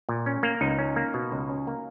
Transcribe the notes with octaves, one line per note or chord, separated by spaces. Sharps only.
A#2
C#4
A#3
C#2 D#4
C#4
A#3
B2
C#2
C#4
A#3